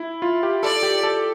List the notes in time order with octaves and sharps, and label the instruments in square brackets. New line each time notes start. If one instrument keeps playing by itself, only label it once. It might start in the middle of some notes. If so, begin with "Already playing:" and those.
Already playing: [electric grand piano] E4
F4
G4
[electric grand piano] A4 [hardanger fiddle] D5
[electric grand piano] G4
A4